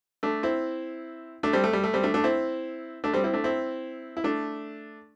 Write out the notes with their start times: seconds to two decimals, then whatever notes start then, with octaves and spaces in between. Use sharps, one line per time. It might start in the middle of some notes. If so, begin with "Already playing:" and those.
0.23 A3 D4
0.43 C4 E4
1.43 A3 D4
1.53 G3 C4
1.64 A3
1.73 G3
1.84 A3
1.93 G3 C4
2.03 A3 D4
2.14 A3 D4
2.24 C4 E4
3.04 A3 D4
3.13 G3 C4
3.24 C4 E4
3.33 A3 D4
3.44 C4 E4
4.17 E4
4.24 A3 D4